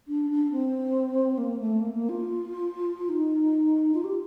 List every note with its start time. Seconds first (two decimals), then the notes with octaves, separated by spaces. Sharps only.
0.08 D4
0.30 D4
0.51 C4
1.38 A#3
1.59 A3
1.80 A#3
1.94 A#3
2.09 F4
3.09 D#4
3.94 F4
4.04 G4